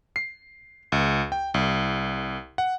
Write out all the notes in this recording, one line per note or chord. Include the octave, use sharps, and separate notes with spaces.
C7
C#2
G5
C2
F#5